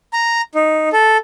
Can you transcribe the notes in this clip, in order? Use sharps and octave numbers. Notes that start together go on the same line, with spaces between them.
A#5
D#4
A4